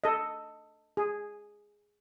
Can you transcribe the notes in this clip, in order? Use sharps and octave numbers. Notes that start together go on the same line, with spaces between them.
A4 D#5
G#4